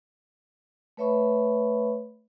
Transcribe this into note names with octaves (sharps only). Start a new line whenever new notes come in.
A3 B4 C#5 E5 B5 C#6